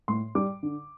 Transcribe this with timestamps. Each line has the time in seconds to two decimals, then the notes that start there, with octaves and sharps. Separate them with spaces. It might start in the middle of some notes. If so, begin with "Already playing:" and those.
0.08 A2 C6
0.35 G3 D6
0.63 D3